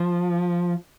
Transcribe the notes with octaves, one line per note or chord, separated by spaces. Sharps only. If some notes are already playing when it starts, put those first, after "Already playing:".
Already playing: F3